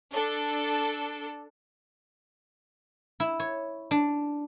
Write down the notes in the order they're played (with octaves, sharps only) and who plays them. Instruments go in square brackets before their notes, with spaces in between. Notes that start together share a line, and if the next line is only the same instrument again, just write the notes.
[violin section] D4 A4
[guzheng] E4
C#5
D4